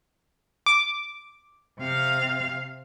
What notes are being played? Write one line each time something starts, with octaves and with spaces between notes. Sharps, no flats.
D6
C3 F5